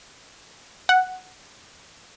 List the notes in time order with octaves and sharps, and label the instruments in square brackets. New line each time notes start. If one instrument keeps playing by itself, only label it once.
[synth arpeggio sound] F#5